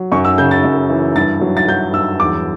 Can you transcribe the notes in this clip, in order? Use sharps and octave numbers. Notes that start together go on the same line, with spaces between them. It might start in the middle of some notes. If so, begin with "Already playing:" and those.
Already playing: F#3
F#2 C#6
E6
C#3 G6
A6
F#2
E3
G2 A6
F#3
A6
F#3 G6
G2 E6
E2 D6